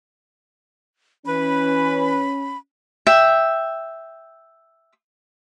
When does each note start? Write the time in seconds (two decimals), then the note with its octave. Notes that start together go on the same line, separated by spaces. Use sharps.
1.26 E3 C#4 B4 B5
3.07 E5 G5